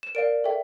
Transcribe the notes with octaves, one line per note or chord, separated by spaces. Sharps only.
E7
A#4 D5 F5 D7
A4 E5 G5